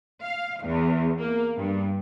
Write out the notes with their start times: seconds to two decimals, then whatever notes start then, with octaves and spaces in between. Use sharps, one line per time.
0.22 F5
0.62 E2
1.19 A#3
1.56 G2